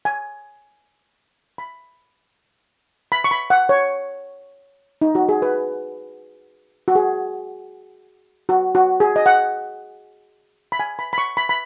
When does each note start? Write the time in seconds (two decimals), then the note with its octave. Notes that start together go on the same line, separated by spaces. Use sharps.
0.05 G#5
1.58 B5
3.12 B5
3.24 C#6
3.31 B5
3.50 F#5
3.69 C#5
5.02 D#4
5.15 F#4
5.29 G#4
5.42 B4
6.88 F#4
6.95 G#4
8.49 F#4
8.75 F#4
9.00 G#4
9.16 D#5
9.26 F#5
10.72 B5
10.80 G#5
10.99 B5
11.13 B5
11.18 C#6
11.37 B5
11.49 B5